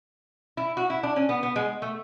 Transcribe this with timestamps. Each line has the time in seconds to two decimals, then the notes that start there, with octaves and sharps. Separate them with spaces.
0.57 E4
0.77 F#4
0.90 E4
1.03 D4
1.16 C#4
1.29 B3
1.43 B3
1.56 G#3
1.82 A3